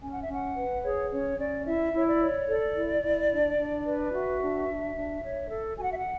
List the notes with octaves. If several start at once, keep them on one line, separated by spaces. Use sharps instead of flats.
C#4 G#5
F#5
E5
C#4 F#5
B4
G#4 C#5
C#4 C#5
C#4 D5
E4 E5
E4 C#5
D5
C#5
A4 D5
E4
E4
D4
D4
B4
F#4 E5
D4
D4
D4
C#5
A4
F#4 G#5
F#5
E5
F#5